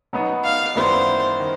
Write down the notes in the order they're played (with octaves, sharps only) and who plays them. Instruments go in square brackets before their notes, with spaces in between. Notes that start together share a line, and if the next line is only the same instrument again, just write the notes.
[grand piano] B2 F#3 B3 D#4
[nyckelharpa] F5
[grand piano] F#2 D#3 G3 B3 E4 [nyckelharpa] C5
[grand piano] D#3